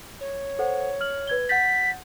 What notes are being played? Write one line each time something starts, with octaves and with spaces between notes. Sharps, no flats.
C#5
A4 C5 F#5
F6 F#7
B4 G#6 G7
F#5 G6 A6 B6